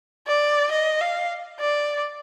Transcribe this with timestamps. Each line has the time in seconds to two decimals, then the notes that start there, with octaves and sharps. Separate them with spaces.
0.27 D5
0.72 D#5
1.01 F5
1.60 D5